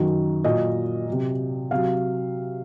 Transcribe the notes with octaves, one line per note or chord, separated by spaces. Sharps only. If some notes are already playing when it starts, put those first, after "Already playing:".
Already playing: F#2 D#3 F#3
A#2 F#3 D#5
C3 F#3
C3 F#3 F5